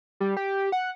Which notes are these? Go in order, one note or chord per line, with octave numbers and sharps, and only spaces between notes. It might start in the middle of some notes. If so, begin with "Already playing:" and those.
G3
G4
F#5